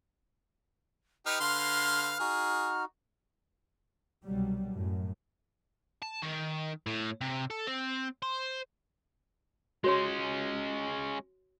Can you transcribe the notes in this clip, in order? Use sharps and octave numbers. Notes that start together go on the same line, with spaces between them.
D#4 G4 B4 F6
D3 F5 C6
D#4 F#4 G#4
C2 B2 F#3 G3
F#2 A2
A5
D#3
A2
C3
A4
C4
C5
G#3 C#4 F#4 C#5 C6